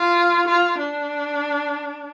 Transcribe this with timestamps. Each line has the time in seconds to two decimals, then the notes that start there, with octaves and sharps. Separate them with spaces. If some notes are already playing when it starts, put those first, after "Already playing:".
Already playing: F4
0.48 F4
0.78 D4